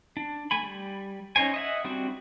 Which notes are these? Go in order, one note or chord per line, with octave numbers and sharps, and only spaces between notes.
D4
A3 G#5 B5
G3
C#4 D#4 C5 G#5
D#5 E5 F#5
G3 C4 D4 F#4